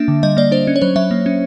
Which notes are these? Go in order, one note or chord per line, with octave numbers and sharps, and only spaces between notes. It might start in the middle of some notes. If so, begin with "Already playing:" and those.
Already playing: A#3 D4 E5
D3
G3 D#5
A#3 D5
D4 C5
C#4
C#5
F#3 C5
F#3 E5
A#3
C#4